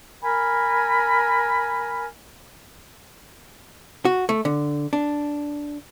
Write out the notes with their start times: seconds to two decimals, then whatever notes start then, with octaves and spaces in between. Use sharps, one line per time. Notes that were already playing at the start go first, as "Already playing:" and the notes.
0.22 A#4 G#5 B5
4.05 F#4
4.29 A3
4.45 D3
4.93 D4